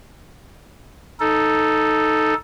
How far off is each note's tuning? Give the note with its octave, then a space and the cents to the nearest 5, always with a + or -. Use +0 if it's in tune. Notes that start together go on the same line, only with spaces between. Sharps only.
D#4 +0 A4 +0